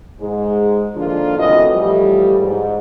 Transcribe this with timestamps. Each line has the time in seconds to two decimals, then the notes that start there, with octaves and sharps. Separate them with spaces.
0.20 G#2 G#3
0.95 D3 D#3 F3 A#3 D4 F4
1.38 F#2 A2 C3 E3 F#4 D#5
1.75 A2 E3 F3 G3
2.40 G#2